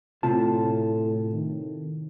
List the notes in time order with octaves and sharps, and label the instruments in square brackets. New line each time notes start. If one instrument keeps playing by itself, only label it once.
[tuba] A2 [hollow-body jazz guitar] C3 F4 A5
[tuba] D#3